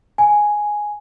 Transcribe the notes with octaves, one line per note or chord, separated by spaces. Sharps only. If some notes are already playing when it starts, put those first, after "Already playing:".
G#5